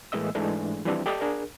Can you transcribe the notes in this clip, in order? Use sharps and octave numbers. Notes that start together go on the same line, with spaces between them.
A2 E3 G#3 A#3 D#5 E6
G#2 E3 G#3 A3 D4 G#4
E3 F3 G3 C4 D4 G4
G4 A4 D5 D#5 A5 D#6
D4 G#4 A#4